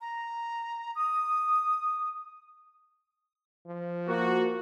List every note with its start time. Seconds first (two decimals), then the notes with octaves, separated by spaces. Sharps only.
0.01 A#5
0.96 D#6
3.66 F3
4.08 A#3 F#4